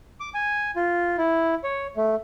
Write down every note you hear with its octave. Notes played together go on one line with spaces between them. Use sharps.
D6
G#5
F4
E4
C#5
A3